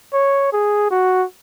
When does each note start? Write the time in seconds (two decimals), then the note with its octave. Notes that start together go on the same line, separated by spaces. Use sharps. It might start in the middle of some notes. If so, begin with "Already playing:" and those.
0.13 C#5
0.52 G#4
0.90 F#4